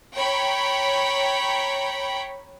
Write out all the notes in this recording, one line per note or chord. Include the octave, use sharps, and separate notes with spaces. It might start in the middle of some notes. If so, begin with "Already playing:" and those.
C#5 G5 A#5 B5